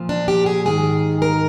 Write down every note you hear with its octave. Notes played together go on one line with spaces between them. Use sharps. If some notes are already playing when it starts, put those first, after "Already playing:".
Already playing: A#2 F3
D4
G4
G#4
G#2 D#3 G#4
A#4